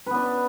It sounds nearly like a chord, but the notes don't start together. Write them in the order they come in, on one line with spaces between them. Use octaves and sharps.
B4 B3 D4